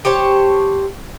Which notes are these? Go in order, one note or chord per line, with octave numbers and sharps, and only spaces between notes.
G4 C5 C#5 A5